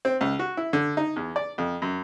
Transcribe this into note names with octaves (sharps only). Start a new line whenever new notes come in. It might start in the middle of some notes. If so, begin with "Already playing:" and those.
C4
C#2
F#4
E4
D3
D#4
E2
D5
F2
F#2